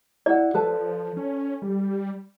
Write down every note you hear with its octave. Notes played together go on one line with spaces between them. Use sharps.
E4 D5 F#5
F3 A4 B4 A5
C#4
G3